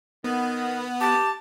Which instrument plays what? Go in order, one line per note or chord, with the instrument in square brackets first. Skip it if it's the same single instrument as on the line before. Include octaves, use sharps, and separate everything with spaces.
[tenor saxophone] D#3 [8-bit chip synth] B3
[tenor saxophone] G4 [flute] A5